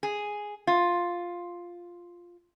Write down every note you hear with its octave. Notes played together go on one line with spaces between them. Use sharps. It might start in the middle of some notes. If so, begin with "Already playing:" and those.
G#4
F4